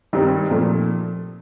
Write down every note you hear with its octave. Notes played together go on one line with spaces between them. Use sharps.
G2 D#3 G3 C4 D#4
A#2 F3 A3